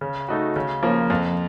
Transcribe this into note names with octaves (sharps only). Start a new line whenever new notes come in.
C#3
A3 D#4 F#4
C#3
F3 A#3 C#4
F2